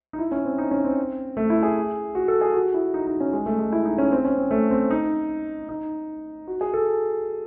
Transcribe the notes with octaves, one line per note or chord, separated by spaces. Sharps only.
D#4
E4
C#4
C4
D#4
C#4
C4
A3
E4
G#4
F#4
A4
G#4
F#4
E4
D#4
D#4
C#4
G#3
A3
G#3
E4
D#4
C#4
C4
C#4
C4
A3
C4
D#4
D#4
F#4
G#4
A4